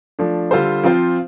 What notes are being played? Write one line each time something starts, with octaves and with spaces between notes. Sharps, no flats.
F3 A3 D4
D3 G3 F4 A4 C5
F3 C4 F4 C5